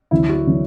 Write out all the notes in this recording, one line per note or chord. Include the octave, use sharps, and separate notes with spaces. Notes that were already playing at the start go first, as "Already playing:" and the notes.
D2 D3 F#3 E4
F#4
D3 F#3